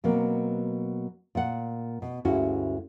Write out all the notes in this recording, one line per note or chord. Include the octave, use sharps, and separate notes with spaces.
B2 F#3 A#3 C4
A#2 F#5
B2
D2 G2 G#3 C#4 E4 F#4